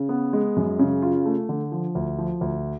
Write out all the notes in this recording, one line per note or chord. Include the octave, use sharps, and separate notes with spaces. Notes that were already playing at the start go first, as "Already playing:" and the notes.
Already playing: C#3
B3
G#3
F#2
C#3
F4
A3
D3
F3
D2
F3
D2